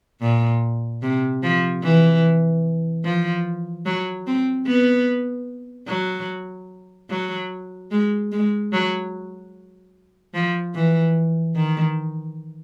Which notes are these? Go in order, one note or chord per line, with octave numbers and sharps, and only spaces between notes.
A#2
C3
F3
E3
F3
F#3
C4
B3
F#3
F#3
G#3
G#3
F#3
F3
E3
D#3